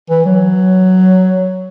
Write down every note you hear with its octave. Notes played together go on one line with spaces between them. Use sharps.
E3
F#3